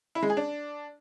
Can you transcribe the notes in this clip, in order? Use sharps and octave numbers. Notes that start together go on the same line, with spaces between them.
E4
G#3
G#4
D4